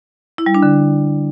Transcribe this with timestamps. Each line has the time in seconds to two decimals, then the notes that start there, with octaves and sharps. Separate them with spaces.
0.38 E4
0.46 G3
0.54 D4
0.63 D3